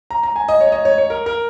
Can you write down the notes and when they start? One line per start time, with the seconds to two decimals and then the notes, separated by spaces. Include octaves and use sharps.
0.10 A#5
0.23 A#5
0.36 G#5
0.48 D#5
0.61 C#5
0.72 D#5
0.85 C#5
0.98 C#5
1.10 A#4
1.26 A#4